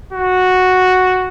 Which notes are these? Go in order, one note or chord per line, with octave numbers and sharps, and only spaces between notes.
F#4